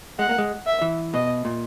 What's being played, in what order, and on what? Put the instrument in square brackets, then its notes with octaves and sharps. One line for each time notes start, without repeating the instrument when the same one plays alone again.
[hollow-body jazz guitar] G#3 [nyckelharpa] F#5
[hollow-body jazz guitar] A#3
G#3
[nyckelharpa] E5
[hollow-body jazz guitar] E3
[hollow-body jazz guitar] B2 [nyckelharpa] D#5
[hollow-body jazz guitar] A#2